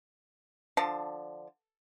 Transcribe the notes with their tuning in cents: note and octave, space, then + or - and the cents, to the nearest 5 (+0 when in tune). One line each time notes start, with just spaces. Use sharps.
D3 +10 F3 +0 A5 +20